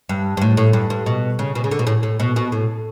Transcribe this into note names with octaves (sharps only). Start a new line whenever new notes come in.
G2
G2
A2
A2
G2
G2
B2
C#3
B2
C#3
D3
B2
A2
A2
B2
B2
A2